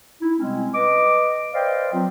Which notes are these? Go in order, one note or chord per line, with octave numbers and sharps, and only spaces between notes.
D#4 E4
C3 G3 G#3 C4 C#4
B4 D#5 D6
B4 C5 D5 D#5 F5 G5
F#3 C4 F4